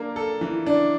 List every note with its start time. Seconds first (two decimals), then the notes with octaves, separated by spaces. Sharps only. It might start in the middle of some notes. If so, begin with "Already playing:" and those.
Already playing: A#3 D4
0.16 A4
0.41 E3
0.66 D4